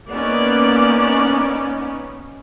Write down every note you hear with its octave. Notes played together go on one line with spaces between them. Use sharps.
A#3 B3 C#4 D#4 D5